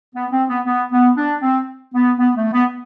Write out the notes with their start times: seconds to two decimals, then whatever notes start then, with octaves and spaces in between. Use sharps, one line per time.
0.15 B3
0.32 C4
0.49 B3
0.66 B3
0.92 B3
1.17 D4
1.42 C4
1.94 B3
2.18 B3
2.36 A3
2.53 B3